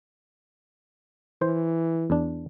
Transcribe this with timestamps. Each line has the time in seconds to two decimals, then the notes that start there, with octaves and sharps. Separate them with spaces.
1.42 E3 C5
2.10 E2 D4